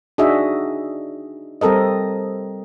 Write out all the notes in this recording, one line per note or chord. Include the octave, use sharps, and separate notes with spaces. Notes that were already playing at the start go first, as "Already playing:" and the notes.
D4 D#4 F#4 G#4 D#5 E5
G3 C4 A4 A#4 D#5